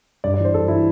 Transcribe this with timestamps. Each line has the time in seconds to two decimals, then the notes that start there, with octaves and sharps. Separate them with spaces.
0.24 G2 D5
0.34 D5
0.40 E3
0.45 C5
0.54 G2 A4
0.68 E3 E4